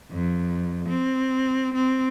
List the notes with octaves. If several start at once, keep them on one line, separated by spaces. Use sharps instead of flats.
F2
C4
C4